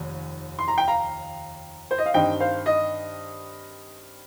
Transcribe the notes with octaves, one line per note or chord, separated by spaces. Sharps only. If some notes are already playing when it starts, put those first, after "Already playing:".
Already playing: F1 D#2
C6
A#5
G5
F5 A#5
C5
D#5
F5
G2 D#3 C4 D#5 G5
C5 F5
D#5